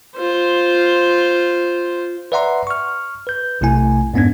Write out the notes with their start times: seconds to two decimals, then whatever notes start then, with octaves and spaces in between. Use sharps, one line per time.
0.17 F4 C5
2.32 B4 D5 E5 F#5 A#5 C6
2.67 C#6 F6
3.27 B4 G6
3.61 B1 C3 A3 E4 G#5
4.14 F2 G#2 B3 C#4 D4 G#6